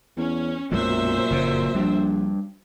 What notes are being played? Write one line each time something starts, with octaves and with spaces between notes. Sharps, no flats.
E2 C#4
B1 F#2 A#2 F#3 G#3 C5 E5
F#1 F2 C#3
A#1 G3 D4